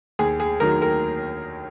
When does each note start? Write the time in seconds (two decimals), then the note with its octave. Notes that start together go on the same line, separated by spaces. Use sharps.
0.19 D#2 G#4
0.40 G#4
0.60 D#3 F#3 A#4
0.82 A#4